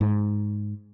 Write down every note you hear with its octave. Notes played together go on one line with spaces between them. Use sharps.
G#2